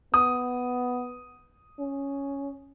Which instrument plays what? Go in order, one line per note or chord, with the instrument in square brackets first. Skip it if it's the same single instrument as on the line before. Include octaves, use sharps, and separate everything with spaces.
[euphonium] B3 [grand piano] D#6
[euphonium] C#4